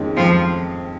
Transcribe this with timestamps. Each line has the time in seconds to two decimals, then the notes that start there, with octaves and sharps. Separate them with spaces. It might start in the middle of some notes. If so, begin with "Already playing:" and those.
Already playing: F2 D#3 G#3 C#4
0.17 F2 F3